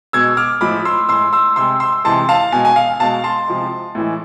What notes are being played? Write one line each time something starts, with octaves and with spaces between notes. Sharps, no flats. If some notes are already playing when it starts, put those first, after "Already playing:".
B2 G#3 E6 G#6
D6 F6
A2 F3 G#3 B5 D6
C6 E6
A2 G#3 C6 E6
C6 E6
C3 G#3 C6 E6
C6 E6
C3 E3 G#3 A5 C6
F5 A5
B2 G#3 G#5
G#5
F5
B2 G#3 F5 A5
A5 C6
C3 F3 G#3
A2 E3 G#3